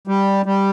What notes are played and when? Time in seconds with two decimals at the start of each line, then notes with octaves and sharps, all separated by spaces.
0.08 G3
0.46 G3